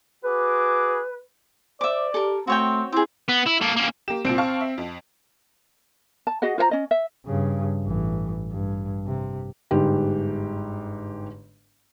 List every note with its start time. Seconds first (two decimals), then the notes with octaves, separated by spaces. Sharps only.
0.24 F#4 G#4 B4 D6
1.81 C5 D5 E5 D6
2.14 G4 A4 A#4
2.47 A3 C4 F#4 C#5 G5
2.92 C4 E4 G4 G#4
3.29 B3
3.47 E4
3.62 A#3 A4
3.77 A#3 C#4
4.08 A#3 G4 E7
4.25 C2 A#2 C4 D7
4.38 F5 A5 C#6
4.61 E5
4.78 F2
6.27 A5
6.42 F#4 G#4 D#5 F#5
6.58 F4 C5 F#5 A#5
6.71 C#4 D#5
6.91 E5
7.26 G2 C#3
7.83 A1 E3
8.51 G2
9.06 C3
9.71 G1 G#2 G4